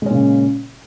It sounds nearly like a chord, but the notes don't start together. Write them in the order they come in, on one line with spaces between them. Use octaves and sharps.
G#3 C#4 A#2 C#3